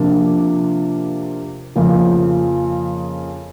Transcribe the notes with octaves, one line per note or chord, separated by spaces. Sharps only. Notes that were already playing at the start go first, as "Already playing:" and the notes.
Already playing: C3 F3 A#3 D4 F4
F2 C#3 F3 A#3